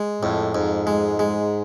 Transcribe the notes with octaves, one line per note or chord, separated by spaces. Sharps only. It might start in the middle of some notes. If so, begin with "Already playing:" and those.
Already playing: G#3
F2 A2
F2 G#2
G#3
G#3